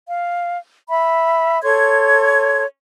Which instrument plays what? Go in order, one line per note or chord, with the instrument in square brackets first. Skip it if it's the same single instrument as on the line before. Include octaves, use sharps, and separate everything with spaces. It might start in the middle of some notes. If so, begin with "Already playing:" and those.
[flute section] F5
E5 B5
A4 C#5 C6 G#6